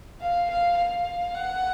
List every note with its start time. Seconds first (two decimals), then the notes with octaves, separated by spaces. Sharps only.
0.21 F5
0.50 F5
0.78 F5
1.34 F#5